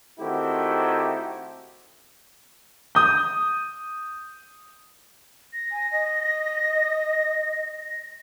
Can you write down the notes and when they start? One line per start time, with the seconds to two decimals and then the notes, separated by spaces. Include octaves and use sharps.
0.19 D#3 A3 C4 E4 F#4 G4
2.95 D#6 G6
5.53 A#6
5.71 G#5
5.92 D#5